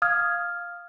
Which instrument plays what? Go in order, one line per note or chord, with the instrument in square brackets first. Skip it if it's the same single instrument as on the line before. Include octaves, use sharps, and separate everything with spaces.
[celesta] F5 D#6 F6 G#6